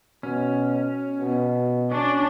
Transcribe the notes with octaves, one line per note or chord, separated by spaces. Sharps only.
B2 C#4
B2
C#4 D4